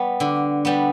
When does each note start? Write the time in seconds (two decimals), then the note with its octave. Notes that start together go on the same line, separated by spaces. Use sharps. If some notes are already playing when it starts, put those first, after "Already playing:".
Already playing: G3 B3
0.20 D3
0.65 G3 B3